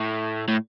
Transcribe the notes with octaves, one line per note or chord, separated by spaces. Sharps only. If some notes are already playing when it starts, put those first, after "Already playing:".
Already playing: A2
A2